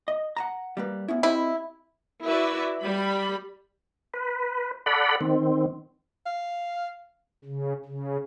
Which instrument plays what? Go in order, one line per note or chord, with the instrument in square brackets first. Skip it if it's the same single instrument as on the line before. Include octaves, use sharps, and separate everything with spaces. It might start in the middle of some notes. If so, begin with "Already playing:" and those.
[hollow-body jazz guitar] D#5
F#5 A5 A#5
G3 A#3 B4
B3 C#4 E4
[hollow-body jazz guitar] C4 G4 D#5 [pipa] E4
[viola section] E4 F#4 B4 D5 E5
G3 B5
[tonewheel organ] B4
A4 D5 F#5 B5
D#3 C4
[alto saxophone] F5
[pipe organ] C#3
C#3